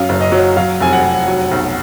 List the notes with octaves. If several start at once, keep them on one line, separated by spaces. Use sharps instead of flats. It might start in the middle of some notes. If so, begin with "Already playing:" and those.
Already playing: F#2 F5
F#1
D#5
F#3
F#3 F5
F1 G#5
F#5
F1
F#3
B1